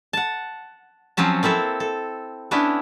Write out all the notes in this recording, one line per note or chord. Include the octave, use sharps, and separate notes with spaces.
F#5 A5
F3 F#3 C4 C#4 A5
A#3 C4 E4 A4
A4
B3 C#4 D4 E4